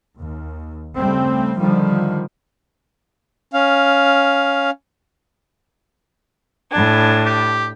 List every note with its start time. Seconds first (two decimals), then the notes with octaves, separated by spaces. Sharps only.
0.18 D#2
0.98 C#3 G3 A3 C4
1.59 D3 D#3 F3 G3
3.54 C#4 F5
6.71 A2 D4 G#5
7.26 G4